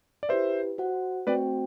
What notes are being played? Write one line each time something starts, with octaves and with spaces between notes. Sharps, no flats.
D5
E4 G4 B4 C5 E5
F#4 C5 F#5
A3 C4 F#4 B4 C5 D5 G5